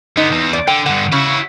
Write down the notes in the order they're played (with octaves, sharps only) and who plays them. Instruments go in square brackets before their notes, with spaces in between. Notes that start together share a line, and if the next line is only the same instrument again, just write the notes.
[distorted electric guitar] D3 B3 [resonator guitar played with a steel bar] D#4
[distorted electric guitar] E2
[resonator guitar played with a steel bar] D5
[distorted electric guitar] D3 [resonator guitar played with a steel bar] G5
[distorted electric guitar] G2 D3 [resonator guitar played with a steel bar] F#5
[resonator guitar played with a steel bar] C#3 [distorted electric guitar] E4 F#4